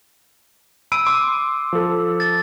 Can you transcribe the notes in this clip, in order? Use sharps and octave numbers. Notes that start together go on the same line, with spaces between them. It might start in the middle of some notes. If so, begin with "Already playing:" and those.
B5 E6 D7 D#7
C6 D6
F3 A4
A6